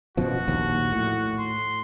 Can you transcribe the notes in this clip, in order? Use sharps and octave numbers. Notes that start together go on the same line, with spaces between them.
F#2 B2 F3 F#4
A#1 D#2
A2
C6